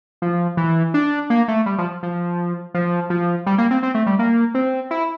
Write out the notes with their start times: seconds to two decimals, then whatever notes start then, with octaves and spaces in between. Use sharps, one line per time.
0.22 F3
0.57 E3
0.94 D4
1.30 A#3
1.48 A3
1.66 G3
1.78 F3
2.03 F3
2.74 F3
3.10 F3
3.46 G3
3.58 A#3
3.71 C4
3.83 C4
3.95 A3
4.07 G3
4.19 A#3
4.55 C4
4.91 E4